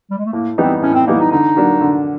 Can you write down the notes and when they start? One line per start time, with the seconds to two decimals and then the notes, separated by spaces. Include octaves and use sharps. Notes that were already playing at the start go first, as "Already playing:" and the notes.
0.11 G3
0.18 G#3
0.25 A3
0.33 A2 A#3
0.58 E3 G3 B3 C4 D#4
0.82 A2 C#4
0.95 C4
1.07 E3 G3 A#3 B3 D#4
1.20 D#4
1.32 D3 D#4
1.56 F#3 A#3 D4 F#4
1.81 D3